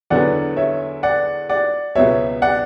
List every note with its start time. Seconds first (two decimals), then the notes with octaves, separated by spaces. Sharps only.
0.10 E2 D3 F#3 B3 D5 F#5
0.57 C#5 E5
1.03 D5 F#5
1.49 D5 F#5
1.95 C#2 B2 F#3 B3 C#5 E5
2.42 D5 F#5